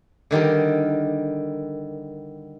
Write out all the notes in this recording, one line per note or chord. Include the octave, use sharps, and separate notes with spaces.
D3 D#3 G3 A#4